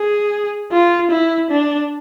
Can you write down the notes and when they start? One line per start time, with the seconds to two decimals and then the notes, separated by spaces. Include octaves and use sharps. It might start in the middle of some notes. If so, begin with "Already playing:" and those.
Already playing: G#4
0.72 F4
1.11 E4
1.51 D4